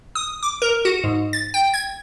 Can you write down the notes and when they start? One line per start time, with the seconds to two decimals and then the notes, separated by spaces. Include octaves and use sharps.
0.15 D#6
0.43 D6
0.62 A#4
0.85 F#4
1.04 G#2
1.33 A6
1.54 G5
1.74 G#6